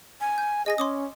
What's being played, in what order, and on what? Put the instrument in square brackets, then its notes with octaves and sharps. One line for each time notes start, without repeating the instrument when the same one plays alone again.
[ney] G#5
[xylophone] G6
[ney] G#4 [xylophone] D#5 G#5 A#6
[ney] C#4 [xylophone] C6 D6 D#6